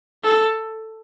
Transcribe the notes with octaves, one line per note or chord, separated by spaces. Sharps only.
A4